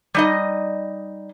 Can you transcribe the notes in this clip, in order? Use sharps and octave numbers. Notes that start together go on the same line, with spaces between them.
G3 D#4 D#5